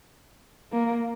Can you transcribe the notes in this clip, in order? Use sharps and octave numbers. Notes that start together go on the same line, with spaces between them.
A#3